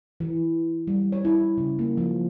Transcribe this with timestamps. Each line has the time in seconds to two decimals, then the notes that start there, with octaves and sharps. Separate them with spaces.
0.20 E3
0.87 G3
1.12 C#5
1.25 E4
1.57 C#3
1.79 A#3
1.97 F3